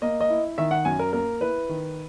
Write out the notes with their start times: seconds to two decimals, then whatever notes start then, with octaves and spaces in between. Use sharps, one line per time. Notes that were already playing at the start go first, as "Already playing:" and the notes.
0.02 A#3 D#5
0.21 D#5
0.30 E4
0.58 D#3 E5
0.71 F#5
0.85 F#2 G#5
0.99 A#4
1.13 A#3 A#4
1.41 E4 B4
1.69 D#3